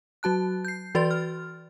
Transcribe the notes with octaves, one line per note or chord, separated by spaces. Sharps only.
F#3 F#4 A5 F#6
G6 C7
E3 F#4 B4 D5 C6 A6
F6